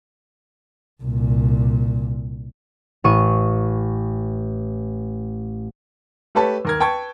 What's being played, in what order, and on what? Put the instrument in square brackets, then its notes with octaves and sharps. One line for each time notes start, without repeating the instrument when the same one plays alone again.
[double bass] C2 A#2
[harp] A1 C#6 D#7
[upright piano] A3 G4 A4 B4 C#5 A5
D#2 A#4 G#6
B4 G5 A5 C#6 G#6